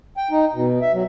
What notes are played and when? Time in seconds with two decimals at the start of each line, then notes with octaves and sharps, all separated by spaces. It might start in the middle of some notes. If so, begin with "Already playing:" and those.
0.17 G5
0.31 D#4
0.54 B2
0.81 E5
0.93 F#3